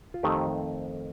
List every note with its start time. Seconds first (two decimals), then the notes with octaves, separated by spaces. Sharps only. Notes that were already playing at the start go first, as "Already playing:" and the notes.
0.14 F4
0.23 F2 D#3 A3 C4 D#4 G4